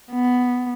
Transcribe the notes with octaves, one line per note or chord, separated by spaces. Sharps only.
B3